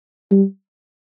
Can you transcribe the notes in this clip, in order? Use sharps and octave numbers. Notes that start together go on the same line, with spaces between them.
G3